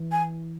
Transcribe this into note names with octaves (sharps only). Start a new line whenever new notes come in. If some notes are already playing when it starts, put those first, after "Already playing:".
Already playing: E3
G#5